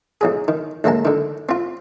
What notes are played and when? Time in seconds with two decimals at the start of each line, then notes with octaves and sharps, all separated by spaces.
0.21 B1 F#3 G#4
0.48 D#3
0.84 D2 F#3 G#3 A#3 A5
1.05 D3 D#3
1.49 C4 F4